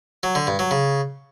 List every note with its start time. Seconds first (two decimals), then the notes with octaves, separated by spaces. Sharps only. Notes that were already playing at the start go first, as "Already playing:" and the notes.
0.23 F#3
0.35 D3
0.47 G2
0.59 F#3
0.71 C#3